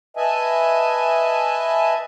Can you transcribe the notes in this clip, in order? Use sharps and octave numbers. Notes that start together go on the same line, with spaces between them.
B4 D#5 E5 G#5 A5